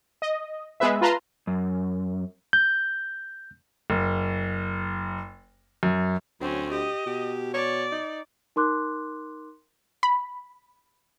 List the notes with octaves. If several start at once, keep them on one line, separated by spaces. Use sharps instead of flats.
D#5
G#3 B3 G#4 B4 E5
F4 B4 A5 A#5 C6
F#2
G6
F#1
F#2
D2 F#3 C4 C#4
G4 D#5
B2 G4
C#5 D5
D#4
D#4 A#4 C6 D6 F#6
B5